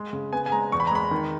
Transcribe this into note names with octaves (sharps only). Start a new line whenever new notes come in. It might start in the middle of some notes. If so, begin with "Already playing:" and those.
Already playing: G#3
C#3
B3 G#5
G#5
G#3 A#5
E2 C#6
B5
A#5
G#3 B5
D#3